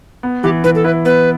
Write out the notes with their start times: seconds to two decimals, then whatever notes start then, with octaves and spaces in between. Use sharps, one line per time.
0.23 B3
0.43 E3 G4
0.64 E3 B4
0.75 A4
0.84 E4 B4
1.05 B3 B4